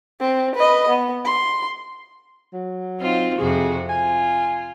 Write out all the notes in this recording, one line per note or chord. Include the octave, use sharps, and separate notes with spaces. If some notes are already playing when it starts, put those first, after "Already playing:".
C4
B4 D#5
B3
C6
F#3
C4 D#4 F4
F2 C3 F#4 G#4
F4 G#5